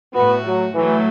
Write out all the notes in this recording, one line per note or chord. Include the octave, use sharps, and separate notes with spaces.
A2 A3 B3 F#4
F#3
A2 E3 F#3 A3